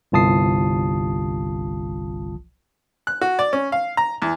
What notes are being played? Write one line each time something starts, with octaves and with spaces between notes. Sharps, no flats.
G1 C2 F4 A5 D#6 C7
F#6
F#4
D5
C#4
F5
A#5
E2